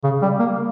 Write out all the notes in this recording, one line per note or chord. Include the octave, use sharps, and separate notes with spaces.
C#3
G3
A#3